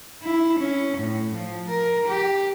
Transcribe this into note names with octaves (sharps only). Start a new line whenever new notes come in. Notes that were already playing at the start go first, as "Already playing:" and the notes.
E4
C#4
A2
F3
A#4
G4